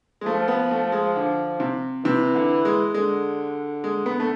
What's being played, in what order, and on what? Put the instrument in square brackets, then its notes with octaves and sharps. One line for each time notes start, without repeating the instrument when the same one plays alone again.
[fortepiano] G#3
[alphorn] F3 [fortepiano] A3
[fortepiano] B3
A3
G#3
D3
C3
[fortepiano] C3 [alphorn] E3
[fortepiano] D3
G#3
[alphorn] D3 [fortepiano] G#3
[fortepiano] G#3
B3
A3